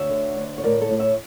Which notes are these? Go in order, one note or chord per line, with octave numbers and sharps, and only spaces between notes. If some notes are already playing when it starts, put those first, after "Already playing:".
Already playing: D2 C#5 E5
D3
D2
C#5
A2 A#4 D5
A4 C#5
A2
C#5 E5